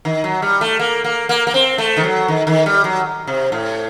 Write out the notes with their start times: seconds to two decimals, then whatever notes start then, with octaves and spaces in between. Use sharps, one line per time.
0.05 D#3
0.24 F#3
0.42 G3
0.61 A3
0.79 A#3
1.04 A#3
1.29 A#3
1.47 A#3
1.54 C4
1.78 A3
1.97 D#3
2.04 F#3
2.28 D#3
2.47 D#3
2.66 G3
2.84 F#3
3.27 C3
3.52 A2